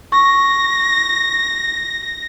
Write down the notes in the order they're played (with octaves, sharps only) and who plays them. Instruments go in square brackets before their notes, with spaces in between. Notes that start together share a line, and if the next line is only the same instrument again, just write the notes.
[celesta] C#6 [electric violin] A#6